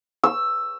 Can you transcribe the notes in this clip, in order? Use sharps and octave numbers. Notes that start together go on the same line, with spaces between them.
E6